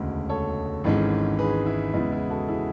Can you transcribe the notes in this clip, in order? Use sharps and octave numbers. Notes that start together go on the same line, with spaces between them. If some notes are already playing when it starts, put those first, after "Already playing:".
Already playing: E1 D2 C#3 G#3
A4 C#5
G#1 G#2 E3 G#3 C#4
G#4 B4
E4
E2 C#3 G#3 B3 E4
E4 G#4
F#4 A4
E4 G#4